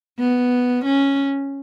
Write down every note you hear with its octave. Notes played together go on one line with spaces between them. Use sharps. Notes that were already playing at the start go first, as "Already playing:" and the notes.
B3
C#4